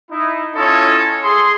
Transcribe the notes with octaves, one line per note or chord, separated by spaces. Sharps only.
D#4 E4
C#4 E4 F4 A4 C#5 D#5
G#4 C6